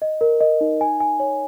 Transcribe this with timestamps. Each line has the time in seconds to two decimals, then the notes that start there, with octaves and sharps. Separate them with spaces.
0.02 D#5
0.21 A#4
0.41 D#5
0.61 D#4
0.81 G#5
1.00 G#5
1.20 C#5